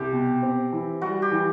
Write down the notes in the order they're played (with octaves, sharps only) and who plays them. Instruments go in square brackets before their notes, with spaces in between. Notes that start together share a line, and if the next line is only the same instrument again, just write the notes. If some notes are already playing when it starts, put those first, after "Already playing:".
Already playing: [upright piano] C2 [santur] G4
[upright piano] B2
C4
E3
[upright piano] G3 [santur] F#4
[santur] G4
[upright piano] E3